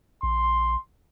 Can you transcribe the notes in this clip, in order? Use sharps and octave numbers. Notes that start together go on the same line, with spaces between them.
A#1 C6